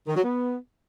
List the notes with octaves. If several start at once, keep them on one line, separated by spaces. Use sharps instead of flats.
D#3
F#3
B3